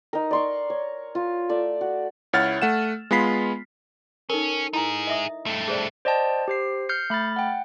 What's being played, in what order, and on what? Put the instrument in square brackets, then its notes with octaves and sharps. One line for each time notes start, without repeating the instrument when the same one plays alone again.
[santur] D#4 A#4
D5 C6 C#6
C#5
F4
A3 D5 E5
F#4
[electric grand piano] C#2 E4 C#5 F#5 F6 A6
A3 F#5 E7
G#3 B3 F4 B5 B6 C7
[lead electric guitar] C#4 [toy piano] D#4 A4 A#4
[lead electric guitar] D#4 G#4 [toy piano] E4 A#5
[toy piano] D#5 E5 D#6
[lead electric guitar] G2 A3
[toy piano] G#4 C5 D5
[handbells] C5 D5 D#5 G5 A5
G4 C5 C7
F6 G6 C7 C#7
A3 B5 F6 A6
F#5 G5